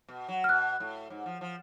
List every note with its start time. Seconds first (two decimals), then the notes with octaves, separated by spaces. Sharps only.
0.08 B2
0.29 F#3
0.44 F6
0.49 B2 F#6
0.80 A2
1.10 G#2
1.26 F3
1.41 F3